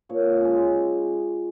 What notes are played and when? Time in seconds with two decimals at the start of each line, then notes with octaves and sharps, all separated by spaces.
0.09 A#2 C#5
0.41 G#3 C#4